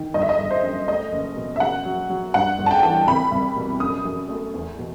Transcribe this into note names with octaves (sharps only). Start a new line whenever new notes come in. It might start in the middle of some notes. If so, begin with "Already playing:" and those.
Already playing: D#3
G1 D#5
E5
D#5
G1
C5
F#2
A3 D#5
F#1
B2
E5
F#2 F#5
F#3
F#3
G2 F#5
G1
A5
G5
E3
C2 B5
C2
B2
F#2 D#6
F#2
A3
E2
B2